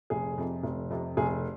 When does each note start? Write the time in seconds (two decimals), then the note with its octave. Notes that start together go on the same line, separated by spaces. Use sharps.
0.10 F1 G#4
0.38 F2 C3
0.63 F1
0.90 F2 C3
1.17 F1 G#4